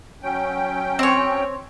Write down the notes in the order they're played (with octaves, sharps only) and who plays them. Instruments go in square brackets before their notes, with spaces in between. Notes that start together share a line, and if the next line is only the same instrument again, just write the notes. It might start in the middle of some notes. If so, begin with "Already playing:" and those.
[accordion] F#3 C#4 G5
[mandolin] C4 C#5